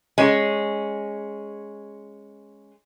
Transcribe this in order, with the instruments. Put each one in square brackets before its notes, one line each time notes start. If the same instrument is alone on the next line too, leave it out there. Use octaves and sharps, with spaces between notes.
[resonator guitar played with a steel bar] G#3 C#4